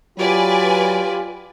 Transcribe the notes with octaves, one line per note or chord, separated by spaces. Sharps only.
F#3 F4 G4 B4 D5 G#5